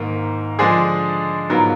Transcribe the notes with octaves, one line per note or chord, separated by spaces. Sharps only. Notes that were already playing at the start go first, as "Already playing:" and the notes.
Already playing: G#2 D#3 A#3
D3 F3 G#3 D4 G#4
G#2 F#3 B3 F4 A#4